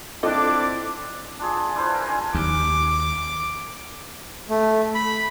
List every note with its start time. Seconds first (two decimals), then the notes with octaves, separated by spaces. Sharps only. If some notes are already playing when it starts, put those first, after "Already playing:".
0.23 C4 D4 E4 F4 A4 D#5 D6
1.39 D4 F4 G#4
1.56 G#5
1.75 D4 E4 B4 C5
1.91 F4 A#4
2.06 C#4 C#5 G#5
2.34 D#2 D6
4.50 A3
4.95 B5